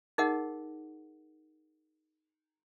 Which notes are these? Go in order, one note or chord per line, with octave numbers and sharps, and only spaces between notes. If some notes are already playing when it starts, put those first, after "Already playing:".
D#4 G#4 A#4 D#5 F#5